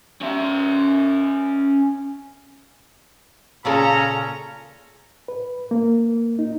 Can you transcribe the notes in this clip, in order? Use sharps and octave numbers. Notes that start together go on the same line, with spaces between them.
C#4 E5
A#2 C#3 C#4 A4 G#5 A#5
B4
A#3
D#4